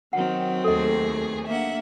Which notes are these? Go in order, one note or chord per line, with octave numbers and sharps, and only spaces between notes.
D#3 F#3 C4 F#5
D#2 A3 G#4 A4 D#5
A#3 D4 E5 F#5